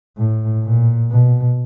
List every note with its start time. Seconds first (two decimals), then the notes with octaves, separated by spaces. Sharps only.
0.18 A2
0.64 A#2
1.11 B2